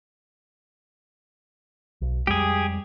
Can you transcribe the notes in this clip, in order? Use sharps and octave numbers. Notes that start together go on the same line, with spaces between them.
B1
F2 G3 G#3 G4 G#4